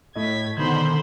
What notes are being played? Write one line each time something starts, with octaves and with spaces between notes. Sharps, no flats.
A2 A3 E4 D#5 G#6 B6
B2 D3 D#3 D#4 C5 B5 G#6